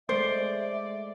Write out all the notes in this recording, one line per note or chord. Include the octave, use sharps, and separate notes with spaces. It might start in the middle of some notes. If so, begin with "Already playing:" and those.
G#3 A3 C5 D5 E5